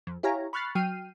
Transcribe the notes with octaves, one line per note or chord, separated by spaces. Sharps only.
F2
E4 G4 C#5 F5 G#5 A#5
B5 C#6 F6 F#6 A6 C7
F#3 G5 F6 C7 D#7